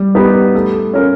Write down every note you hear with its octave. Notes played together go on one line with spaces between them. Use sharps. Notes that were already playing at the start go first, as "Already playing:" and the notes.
Already playing: G3
B3 D#4 G4
A3
C#4 F4 A#4